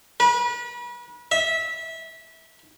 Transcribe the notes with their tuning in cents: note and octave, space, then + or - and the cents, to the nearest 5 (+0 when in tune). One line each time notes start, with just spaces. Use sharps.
B4 -35
E5 -20